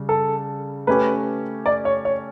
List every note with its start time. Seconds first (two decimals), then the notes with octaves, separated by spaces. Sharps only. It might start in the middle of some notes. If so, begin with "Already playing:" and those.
Already playing: C#3 G3
0.09 A4
0.87 A3 C#4 G4 B4
1.66 D5
1.85 C#5
2.05 C#5